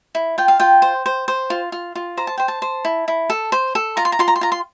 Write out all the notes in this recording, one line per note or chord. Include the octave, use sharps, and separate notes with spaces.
E4
F4 G5
F5
F4 G5
C5
C5
C5
F4
F4
F4
C5 A#5
A5
C5 G5
A5
C5
E4
E4
A4
C5
A4
F4 A#5
C6
A#5
F4 C6
A#5
C6
F4 A#5
C6